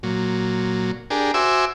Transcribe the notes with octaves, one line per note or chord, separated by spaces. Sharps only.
A#2 F#3
D4 G4 G#4 A#4
F#4 C5 E5 G#5 D6 E6